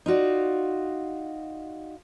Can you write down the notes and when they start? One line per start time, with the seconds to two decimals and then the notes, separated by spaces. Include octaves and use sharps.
0.06 D#4 F4 F#4 D5